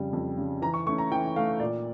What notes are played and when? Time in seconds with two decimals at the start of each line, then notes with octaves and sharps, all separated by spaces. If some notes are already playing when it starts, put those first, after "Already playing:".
Already playing: F2 C#3 G3
0.13 F2
0.37 C#3 G3
0.62 E3 A#5
0.74 C#6
0.86 A3 C#4 C#6
0.98 A#5
1.11 E3 G5
1.36 A3 C#4 F5
1.60 A#2 D5